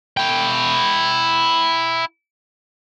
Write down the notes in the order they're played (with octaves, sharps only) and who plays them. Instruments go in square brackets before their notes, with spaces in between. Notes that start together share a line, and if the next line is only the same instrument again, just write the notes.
[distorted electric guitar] E4 G5